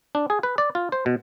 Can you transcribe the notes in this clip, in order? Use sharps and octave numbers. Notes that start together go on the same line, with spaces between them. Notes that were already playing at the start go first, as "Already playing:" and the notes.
D4
G#4
B4
D5
F4
C5
B2